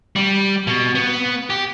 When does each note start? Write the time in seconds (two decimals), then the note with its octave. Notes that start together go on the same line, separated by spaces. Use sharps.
0.16 G3
0.67 B2
0.95 B3
1.50 G4